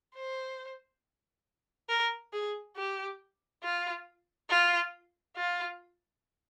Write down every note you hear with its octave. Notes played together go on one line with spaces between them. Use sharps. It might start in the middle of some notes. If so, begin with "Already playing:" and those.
C5
A#4
G#4
G4
F4
F4
F4